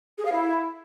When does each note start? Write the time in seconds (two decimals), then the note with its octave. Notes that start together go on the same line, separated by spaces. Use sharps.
0.18 G#4
0.25 F5
0.32 E4